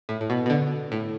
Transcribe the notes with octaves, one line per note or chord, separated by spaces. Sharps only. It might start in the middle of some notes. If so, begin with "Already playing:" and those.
A2
A2
B2
B2
D3
A2